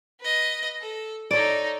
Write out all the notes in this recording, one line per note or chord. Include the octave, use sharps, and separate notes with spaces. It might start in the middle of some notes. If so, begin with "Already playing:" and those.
B4 D#5
A4
D#4 A4 C#5 D5